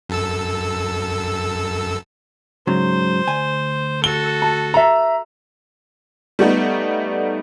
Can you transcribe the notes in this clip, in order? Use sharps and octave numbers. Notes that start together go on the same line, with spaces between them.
F#2 A4 E6
G#2 C#3 F#3 C5
D2 G#5
F#4 A4 G7
A5
E5 A#5
G3 A3 B3 D#4